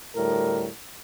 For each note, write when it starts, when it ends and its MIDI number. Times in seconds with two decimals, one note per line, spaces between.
0.16 0.68 38
0.16 0.68 45
0.16 0.68 55
0.16 0.68 70